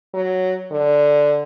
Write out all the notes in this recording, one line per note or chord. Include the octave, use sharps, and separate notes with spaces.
F#3
D3